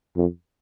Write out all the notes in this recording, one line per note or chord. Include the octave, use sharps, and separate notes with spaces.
F2